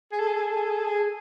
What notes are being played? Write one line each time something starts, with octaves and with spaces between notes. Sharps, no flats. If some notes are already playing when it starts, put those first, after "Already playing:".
G#4
A4
G#4
A4
G#4
A4
G#4
A4
G#4
A4
G#4